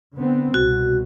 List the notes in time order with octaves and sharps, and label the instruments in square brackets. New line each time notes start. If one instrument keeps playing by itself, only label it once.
[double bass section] D3 B3 C4
[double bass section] C2 B2 [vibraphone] F#4